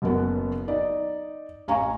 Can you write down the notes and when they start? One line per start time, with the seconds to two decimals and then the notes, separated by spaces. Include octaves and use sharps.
0.02 F#1 F#2 B3 F#4
0.68 D#4 D5 D#5
1.68 A1 F5 G#5 A#5 C#6